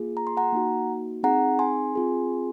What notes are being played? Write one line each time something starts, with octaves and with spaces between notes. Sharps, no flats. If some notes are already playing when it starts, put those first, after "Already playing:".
Already playing: A#3 F4 G#4
A#5
C6
F#5 A#5
A#3 D#4 F#4
C4 D#4 G#4 F#5 A#5
G#5 C6
C4 F4 G#4